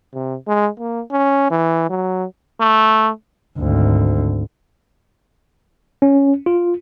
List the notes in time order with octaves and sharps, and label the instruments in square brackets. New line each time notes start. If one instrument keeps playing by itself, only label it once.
[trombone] C3
G#3
A#3
C#4
E3
F#3
A3
[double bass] G#1 D2
[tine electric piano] C#4
F4